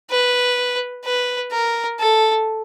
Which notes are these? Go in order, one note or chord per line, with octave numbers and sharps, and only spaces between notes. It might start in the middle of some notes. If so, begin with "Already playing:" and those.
B4
B4
A#4
A4